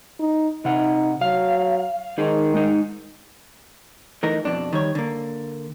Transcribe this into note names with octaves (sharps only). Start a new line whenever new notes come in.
D#4
C3 D#4 F#5
F#3 F5
D#3 D#4 G#4
G#3 D#4
E3 A3 D#4 A#4
F2 B2 D4
D#3 G3 C#5
D3 A#3